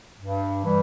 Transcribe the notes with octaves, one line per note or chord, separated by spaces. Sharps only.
G2
E3 G3